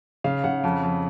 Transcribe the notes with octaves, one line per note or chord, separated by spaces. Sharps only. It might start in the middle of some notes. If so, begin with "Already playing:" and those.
C#3 F5
C#3 F#5
F2
F2